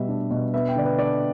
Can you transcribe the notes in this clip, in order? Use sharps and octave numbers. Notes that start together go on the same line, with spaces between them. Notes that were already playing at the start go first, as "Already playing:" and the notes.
Already playing: B2 G3 E5
D4
B2
B3 E5
G5
D3 D5
B4
D4 D5